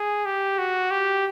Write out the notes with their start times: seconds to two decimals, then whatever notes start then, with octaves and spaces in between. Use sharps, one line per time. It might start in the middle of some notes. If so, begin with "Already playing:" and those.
Already playing: G#4
0.26 G4
0.58 F#4
0.91 G4